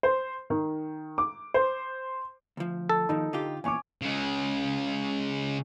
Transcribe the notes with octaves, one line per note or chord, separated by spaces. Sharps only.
C5
D#3
D6
C5
D2 F3
A4
D#2 D#3 F3 D#4
D3 F4 G4
E2 A#2 C#4 G#5 C#6 D6
C#3 G#3